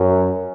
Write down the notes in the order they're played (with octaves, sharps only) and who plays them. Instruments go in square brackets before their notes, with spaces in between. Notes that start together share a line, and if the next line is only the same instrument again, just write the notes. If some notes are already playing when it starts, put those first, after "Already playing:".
Already playing: [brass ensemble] F#2